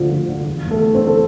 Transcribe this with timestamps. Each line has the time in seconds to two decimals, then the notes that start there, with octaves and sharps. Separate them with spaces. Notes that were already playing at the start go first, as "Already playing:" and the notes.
Already playing: D2 D3 F3 F4
0.10 F3
0.29 D3
0.47 E2
0.64 E2
0.70 A3 A4
0.83 E3
0.95 C4 C5
1.00 E3
1.07 A4